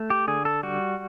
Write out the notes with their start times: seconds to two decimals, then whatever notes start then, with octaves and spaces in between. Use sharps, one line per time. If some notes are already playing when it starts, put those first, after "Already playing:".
Already playing: A3
0.10 G4
0.28 D3 G#4
0.45 A4
0.63 G3 F#4